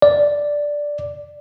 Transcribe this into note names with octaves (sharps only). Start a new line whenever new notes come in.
D5